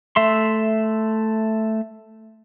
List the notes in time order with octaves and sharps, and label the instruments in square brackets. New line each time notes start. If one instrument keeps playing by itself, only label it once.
[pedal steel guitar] A3 E5 C6